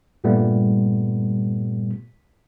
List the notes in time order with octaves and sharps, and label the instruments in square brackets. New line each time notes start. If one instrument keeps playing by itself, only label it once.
[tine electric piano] G2 A#2 G3 A3 B3